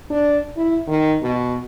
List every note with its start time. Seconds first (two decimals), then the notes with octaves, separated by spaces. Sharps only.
0.10 D4
0.57 E4
0.87 D#3
1.23 B2